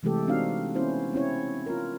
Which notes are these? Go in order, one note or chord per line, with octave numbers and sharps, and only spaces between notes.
C3 E3 G#3 A3 G4 A4
C4 D4 D#4 F#4 F5
B3 C#4 E4 C5
C4 C#4 E4 C#5
F4 A#4